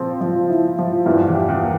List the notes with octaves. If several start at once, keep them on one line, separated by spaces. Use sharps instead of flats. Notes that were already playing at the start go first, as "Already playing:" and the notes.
Already playing: A#2 C#3 F3 C4
F3
E4
F3
E2 G2 E3
E2
G4
E2
A#3